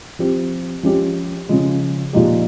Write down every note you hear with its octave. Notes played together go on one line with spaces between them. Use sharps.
F3 C4 G4
F3 G#3 C#4 G4
C#3 F3 G#3
A#2 F3 G#3 D#4 G4